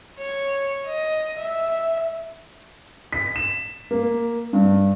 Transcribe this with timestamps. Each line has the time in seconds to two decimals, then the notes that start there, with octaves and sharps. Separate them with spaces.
0.19 C#5
0.86 D#5
1.38 E5
3.13 B6
3.36 E7
3.91 A#3
4.53 G2